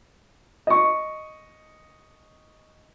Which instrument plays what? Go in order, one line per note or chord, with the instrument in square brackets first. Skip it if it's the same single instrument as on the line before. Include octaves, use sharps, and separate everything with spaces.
[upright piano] D#5 C#6